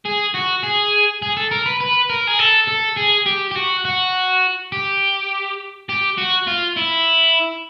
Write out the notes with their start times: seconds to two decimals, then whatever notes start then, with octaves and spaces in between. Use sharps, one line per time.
0.05 G#4
0.35 F#4
0.64 G#4
1.22 G#4
1.37 A4
1.51 A#4
1.66 B4
1.80 B4
2.09 A#4
2.27 G#4
2.39 A4
2.68 A4
2.97 G#4
3.26 G4
3.51 G4
3.56 F#4
3.85 F#4
4.72 G4
5.89 G4
6.18 F#4
6.47 F4
6.77 E4